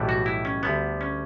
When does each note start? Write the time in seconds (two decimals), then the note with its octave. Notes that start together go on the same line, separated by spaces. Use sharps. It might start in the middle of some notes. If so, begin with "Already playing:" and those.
Already playing: B1 A2 E3 G3 B3
0.09 F#4
0.26 E4
0.45 C#4
0.63 D2 D3 G3 B3
1.01 C#4